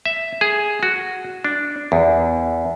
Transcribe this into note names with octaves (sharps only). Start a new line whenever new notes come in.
E5
G#4
F#4
D4
E2